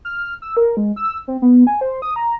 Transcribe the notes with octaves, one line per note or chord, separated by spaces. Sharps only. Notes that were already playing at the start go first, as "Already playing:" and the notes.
F6
E6
A#4
G#3
E6
C4
B3
G#5
C5
D#6
A#5